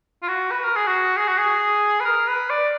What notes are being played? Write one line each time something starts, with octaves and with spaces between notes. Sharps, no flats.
F4
F#4
B4
A#4
G#4
F#4
G#4
F#4
G#4
B4
A#4
B4
D5